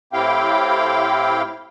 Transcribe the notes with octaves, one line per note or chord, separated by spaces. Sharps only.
A2 C4 E4 G4 F5 G5